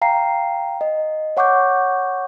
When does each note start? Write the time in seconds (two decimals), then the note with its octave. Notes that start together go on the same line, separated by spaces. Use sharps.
0.02 F5 G5 A#5 C7
0.81 D#5
1.37 C#5 F#5 C#6 D6 G6